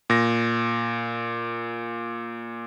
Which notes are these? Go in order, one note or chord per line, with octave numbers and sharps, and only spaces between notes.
A#2 A#6